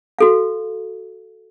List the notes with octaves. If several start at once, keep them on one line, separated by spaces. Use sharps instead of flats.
F#4 A4 F5